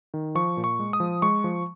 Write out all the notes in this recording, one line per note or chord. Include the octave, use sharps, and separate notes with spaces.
D#3
F3 C#6
A#2
C#6
G#3
D#6
F3
G#3 C#6
F3